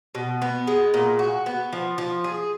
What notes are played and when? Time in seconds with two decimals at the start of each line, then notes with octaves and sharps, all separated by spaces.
0.15 B2
0.42 B3
0.67 G#3
0.94 A#2
1.19 F#4
1.46 B3
1.73 F3
1.98 F3
2.24 G#4